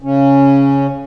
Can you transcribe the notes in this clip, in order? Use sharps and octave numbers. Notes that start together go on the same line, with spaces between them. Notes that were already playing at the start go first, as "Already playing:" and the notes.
C#3 C#4